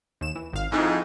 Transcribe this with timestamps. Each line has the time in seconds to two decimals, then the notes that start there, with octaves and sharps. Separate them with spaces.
0.21 D#2 E7
0.36 E3
0.53 G#1 F5
0.72 F2 G#2 F3 D#4 E4